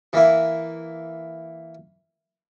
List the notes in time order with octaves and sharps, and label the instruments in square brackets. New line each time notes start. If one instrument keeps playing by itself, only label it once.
[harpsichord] E3 A#3 E4